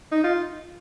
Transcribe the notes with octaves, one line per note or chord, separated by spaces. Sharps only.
D#4
F4